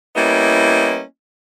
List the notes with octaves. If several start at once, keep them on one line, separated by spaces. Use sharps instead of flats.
G3 A#3 B3 C#4 E4 D#5